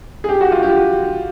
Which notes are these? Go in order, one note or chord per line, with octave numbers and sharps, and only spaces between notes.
G#4
G4
F#4
F4
G4